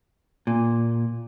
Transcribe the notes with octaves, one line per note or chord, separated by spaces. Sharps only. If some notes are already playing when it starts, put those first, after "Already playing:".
A#2